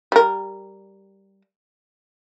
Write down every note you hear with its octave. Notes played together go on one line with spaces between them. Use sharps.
G3 A#4